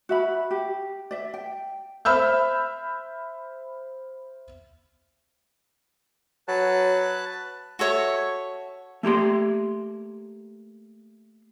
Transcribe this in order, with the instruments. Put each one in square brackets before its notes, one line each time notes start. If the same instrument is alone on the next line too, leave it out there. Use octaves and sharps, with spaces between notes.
[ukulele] F#4 E5 B5
G4
D5 E5
G5
[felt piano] C5 E5 B5 E6 F6 G6
[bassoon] F#3 [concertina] B4 A5 F#6
[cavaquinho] F#4 A4 C#5 E5
[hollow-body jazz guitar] A3 A#3 G4 C6